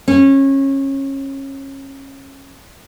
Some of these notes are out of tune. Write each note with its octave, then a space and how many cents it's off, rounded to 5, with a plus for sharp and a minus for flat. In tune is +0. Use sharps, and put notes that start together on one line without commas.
C#4 -25